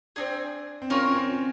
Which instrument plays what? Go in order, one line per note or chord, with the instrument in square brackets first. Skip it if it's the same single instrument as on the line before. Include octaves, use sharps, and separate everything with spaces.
[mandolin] C4 D#4 G#4 [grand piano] D4
[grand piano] C4
[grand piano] C#4 [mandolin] F4 A#4 C#5
[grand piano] C#4
C4